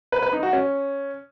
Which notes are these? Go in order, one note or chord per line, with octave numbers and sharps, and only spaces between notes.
B4
B4
D#4
F#4
C#4